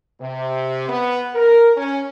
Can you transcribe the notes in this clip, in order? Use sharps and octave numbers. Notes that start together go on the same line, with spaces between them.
C3
B3
A#4
C#4